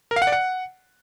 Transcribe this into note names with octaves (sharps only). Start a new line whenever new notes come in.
A#4
F5
F#5
D5
F#5